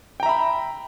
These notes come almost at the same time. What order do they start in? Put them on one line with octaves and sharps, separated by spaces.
G5 A#5 E5 B5